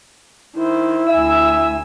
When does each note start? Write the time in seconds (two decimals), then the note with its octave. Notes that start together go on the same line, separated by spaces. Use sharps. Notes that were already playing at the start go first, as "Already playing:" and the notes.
0.55 D#3 E4 C5
1.10 D2 E5 G#5 E6